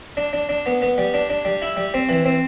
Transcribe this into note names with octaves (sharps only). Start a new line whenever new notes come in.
D4
D4
D4
B3
B3
G3
D4
D4
G3
E4
G3
C4
E3
C4